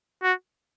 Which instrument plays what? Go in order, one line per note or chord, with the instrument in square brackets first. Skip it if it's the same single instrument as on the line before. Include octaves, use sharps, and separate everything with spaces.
[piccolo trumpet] F#4